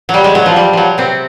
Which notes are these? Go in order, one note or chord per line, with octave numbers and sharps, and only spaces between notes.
F#3
G3
G#3
F#3
F3
G3
F3 F#3
C3 C4